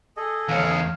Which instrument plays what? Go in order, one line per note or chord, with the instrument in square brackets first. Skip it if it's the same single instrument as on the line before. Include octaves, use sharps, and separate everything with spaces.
[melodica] G#4 A4 D#5
[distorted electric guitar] E2 C#5 [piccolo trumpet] F5